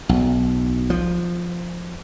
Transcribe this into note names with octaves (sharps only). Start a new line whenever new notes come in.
B1
F3